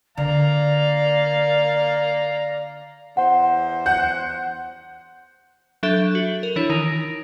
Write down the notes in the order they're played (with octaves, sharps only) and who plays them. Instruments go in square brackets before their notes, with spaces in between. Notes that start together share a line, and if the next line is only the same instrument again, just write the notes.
[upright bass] D3 [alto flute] D5 [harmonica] F5 A#5
[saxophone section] E2 C5 [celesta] F#5
[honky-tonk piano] F#5 [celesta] G6
[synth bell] F#3 D4 A4 E5 G6 G7
F#4
A#4
E3 D4 E4 C#5
D#3 D#4 F7
A#6 D7